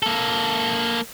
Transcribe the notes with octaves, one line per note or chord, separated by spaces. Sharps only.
A#3 A4